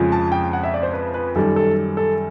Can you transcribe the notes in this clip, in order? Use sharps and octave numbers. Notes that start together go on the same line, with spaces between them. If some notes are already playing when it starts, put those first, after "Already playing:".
Already playing: F2 C#3 F3 G#3
A5
G5
F#5
E5
D5
C5
B4
B4
F#2 D#3 G3 A4
A4
A4